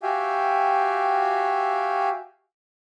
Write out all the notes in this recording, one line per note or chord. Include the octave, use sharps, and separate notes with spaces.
F#4 G4 E5 F5 G5 G#5